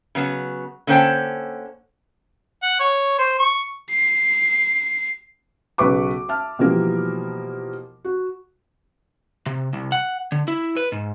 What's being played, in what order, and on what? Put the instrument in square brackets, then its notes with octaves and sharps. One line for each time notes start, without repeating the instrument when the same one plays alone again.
[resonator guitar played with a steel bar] C#3 F#3 B3
D3 A#3 C#4 C5 G5 A5
[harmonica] F#5
C#5
C5
C#6
[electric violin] C7
[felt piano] B1 C#3 B4 C#6 D6
E5 A5 F6
B2 E3 F3 G3 A#3 A#4
F#4
[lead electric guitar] C3
C2
F#5
D3
E4
B4
G#2